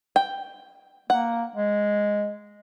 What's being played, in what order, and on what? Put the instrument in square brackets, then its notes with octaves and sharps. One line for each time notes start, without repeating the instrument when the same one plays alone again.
[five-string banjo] G5
[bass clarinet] A#3 [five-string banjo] F#5
[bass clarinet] G#3